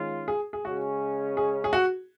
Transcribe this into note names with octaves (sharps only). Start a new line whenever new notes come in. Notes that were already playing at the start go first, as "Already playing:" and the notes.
Already playing: D#3 G#3 C#4 F4
G#4
G#4
C#3 G#3 C#4 F#4
G#4
G#4
F#4